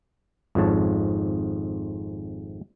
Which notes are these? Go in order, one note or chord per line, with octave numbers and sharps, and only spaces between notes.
G#1 F2 G#2 C#5 A5